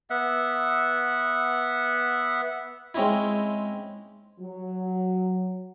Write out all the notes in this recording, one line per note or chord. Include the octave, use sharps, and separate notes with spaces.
B3 E5 F#5
G#3 C4 C#4 D#4 E4
F#3